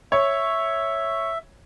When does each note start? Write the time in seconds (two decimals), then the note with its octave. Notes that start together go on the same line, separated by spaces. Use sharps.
0.12 C#5 E5